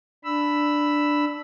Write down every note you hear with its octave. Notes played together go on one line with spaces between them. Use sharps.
D4 B5 E6